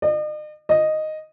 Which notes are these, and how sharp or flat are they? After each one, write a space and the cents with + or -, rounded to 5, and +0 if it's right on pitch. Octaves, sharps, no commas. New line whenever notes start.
D#5 -45
D#5 -5